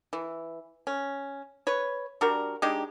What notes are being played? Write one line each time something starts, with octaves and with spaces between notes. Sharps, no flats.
E3
C#4
B4 C#5
G3 D4 F#4 A#4
G#3 D4 D#4 G4